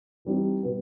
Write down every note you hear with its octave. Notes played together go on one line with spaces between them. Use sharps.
E3 G3 C4 D#4
B2 G3 B3